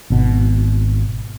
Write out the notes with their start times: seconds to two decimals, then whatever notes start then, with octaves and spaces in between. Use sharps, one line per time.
0.10 G#1 B2